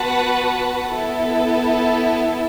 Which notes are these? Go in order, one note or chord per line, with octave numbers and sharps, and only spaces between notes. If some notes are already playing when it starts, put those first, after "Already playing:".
Already playing: B3 F#4 B4 F#5 A5
B3 E4 A4